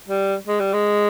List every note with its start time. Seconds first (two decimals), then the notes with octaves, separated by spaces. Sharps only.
0.08 G3
0.47 G#3
0.60 G3
0.73 G#3